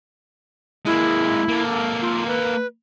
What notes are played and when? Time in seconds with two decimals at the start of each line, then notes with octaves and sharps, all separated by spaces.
0.86 G#3 A#3 E4
1.49 A#3 A4
2.02 F4
2.27 B4